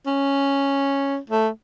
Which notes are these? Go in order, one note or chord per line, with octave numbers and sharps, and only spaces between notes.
C#4
A3